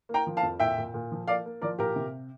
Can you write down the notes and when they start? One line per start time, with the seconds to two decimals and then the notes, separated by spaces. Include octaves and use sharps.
0.09 A#3
0.14 G5 A#5
0.27 F3
0.37 F5 A5
0.43 F2
0.60 A#2 E5 G5
0.78 A#2
0.94 A#2
1.12 F3
1.28 A#3 D5 F5
1.46 A#3
1.62 F3 A#4 D5
1.79 A#2 G4 A#4
1.96 C3